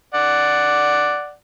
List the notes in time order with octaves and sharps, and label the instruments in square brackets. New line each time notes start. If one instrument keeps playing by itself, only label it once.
[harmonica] D5 F#5